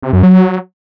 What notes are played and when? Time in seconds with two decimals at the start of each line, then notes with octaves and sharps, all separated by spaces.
0.03 C3
0.13 F#2
0.23 F#3